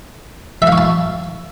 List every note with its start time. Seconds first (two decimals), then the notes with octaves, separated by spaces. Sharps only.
0.62 E5
0.67 F5
0.72 C#6
0.78 A5